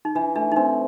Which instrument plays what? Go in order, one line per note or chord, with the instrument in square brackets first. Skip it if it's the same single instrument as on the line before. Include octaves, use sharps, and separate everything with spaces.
[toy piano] D#4
[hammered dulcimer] E3 [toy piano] D4
[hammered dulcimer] A3 [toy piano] D4
[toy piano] D#4
[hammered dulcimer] C4 [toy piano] D4